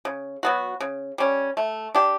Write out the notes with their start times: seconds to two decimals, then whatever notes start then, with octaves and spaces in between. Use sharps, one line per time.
0.05 C#3
0.43 F#3 B3 F#4
0.80 C#3
1.18 G3 C#4
1.57 A3
1.95 D4 G4